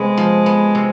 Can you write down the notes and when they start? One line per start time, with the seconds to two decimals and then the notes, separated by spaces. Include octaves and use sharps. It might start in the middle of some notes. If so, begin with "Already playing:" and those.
Already playing: C3 G#3 B3
0.17 F3
0.46 B3
0.75 C3